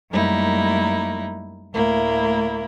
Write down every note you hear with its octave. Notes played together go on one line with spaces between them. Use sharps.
F#2 G3 A3 A#3 D#4 E4
D2 A2 A#3 E4